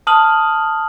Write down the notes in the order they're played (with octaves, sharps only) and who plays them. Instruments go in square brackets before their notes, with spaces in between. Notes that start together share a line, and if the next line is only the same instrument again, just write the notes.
[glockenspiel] A5 D#6 F6 F#7